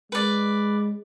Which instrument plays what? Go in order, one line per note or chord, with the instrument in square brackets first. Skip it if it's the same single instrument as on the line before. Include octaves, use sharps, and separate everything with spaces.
[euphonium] G#3 [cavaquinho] B4 D5